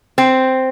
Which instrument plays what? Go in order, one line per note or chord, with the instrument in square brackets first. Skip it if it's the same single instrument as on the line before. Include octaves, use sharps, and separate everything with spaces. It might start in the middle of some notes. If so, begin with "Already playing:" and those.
[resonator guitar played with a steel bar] C4